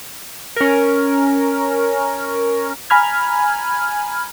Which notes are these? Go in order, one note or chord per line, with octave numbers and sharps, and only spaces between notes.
C#4 A#4
G#5 A#5 B5 F6 G#6